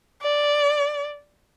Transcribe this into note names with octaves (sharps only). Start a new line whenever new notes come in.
D5